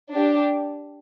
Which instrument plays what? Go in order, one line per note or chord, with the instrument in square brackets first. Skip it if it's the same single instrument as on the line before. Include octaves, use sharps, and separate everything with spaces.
[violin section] D4 G4